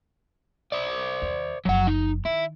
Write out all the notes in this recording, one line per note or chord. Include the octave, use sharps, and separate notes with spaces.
C5 D5
D#2
F#1 F3 F#3 F#5
D#4
D#3 E4